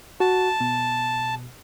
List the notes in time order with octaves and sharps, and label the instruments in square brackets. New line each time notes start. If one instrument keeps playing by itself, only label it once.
[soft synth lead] F#4 [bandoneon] A5
[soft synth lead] B2